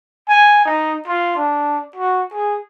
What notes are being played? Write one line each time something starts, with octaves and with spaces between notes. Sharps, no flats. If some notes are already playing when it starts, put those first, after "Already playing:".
G#5
D#4
F4
D4
F#4
G#4